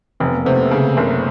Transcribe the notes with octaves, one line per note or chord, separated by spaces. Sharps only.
F1 C4
B3
A#3
C3 A3 B3
C#3
F#1